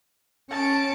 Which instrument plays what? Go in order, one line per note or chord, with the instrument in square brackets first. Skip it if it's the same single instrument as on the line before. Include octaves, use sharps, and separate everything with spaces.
[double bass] C#4 [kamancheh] A5 [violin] C#7 D7